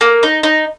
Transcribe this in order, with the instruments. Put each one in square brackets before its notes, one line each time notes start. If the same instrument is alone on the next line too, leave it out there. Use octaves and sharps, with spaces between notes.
[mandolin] A#3
D#4
D#4